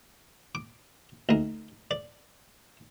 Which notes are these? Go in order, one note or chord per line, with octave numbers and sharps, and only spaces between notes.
D6
D2 D#4
D5